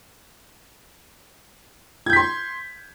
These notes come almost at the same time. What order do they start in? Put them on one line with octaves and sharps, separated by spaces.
G#6 G6 B6 C6